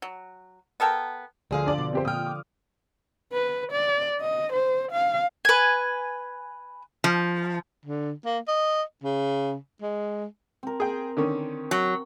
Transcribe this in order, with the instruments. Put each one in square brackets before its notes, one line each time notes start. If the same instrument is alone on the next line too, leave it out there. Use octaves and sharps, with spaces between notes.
[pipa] F#3
B3 A4 A#4 G5
[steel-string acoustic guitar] D2 G#4 F5 [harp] D3 F3
[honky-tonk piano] D4 D5
[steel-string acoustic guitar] B2
[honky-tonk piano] C4 G4 C5
[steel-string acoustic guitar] A#2 G5 [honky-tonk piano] D#6 F6
[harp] D6
[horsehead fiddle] B4
D5
D#5
C5
F5
[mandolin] B4 G#5
[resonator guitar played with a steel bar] F3
[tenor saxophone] D3
A#3
D#5
C#3
G#3
[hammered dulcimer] C4 A#4
[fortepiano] G#4 G5
D3 D#3 C#4
[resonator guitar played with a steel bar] F#3